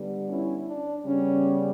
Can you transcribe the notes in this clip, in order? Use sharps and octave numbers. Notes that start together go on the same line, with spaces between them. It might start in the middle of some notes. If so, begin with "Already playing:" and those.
Already playing: D3 G3 B3
C#4 E4
D4
C#3 G3 B3 C#4